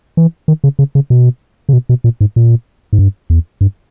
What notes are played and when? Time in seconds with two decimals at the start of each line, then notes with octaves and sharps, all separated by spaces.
0.17 E3
0.48 D#3
0.64 C#3
0.79 C#3
0.95 C#3
1.10 B2
1.69 C#3
1.73 B2
1.89 B2
2.04 A#2
2.21 G#2
2.36 A#2
2.93 G#2
2.99 G2
3.30 E2
3.61 G2